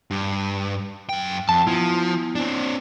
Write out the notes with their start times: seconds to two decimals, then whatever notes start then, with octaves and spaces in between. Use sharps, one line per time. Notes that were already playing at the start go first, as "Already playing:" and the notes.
0.11 G2
1.09 F#2 G5
1.49 F2 A5
1.67 F3 B3 E4
2.35 C4 D4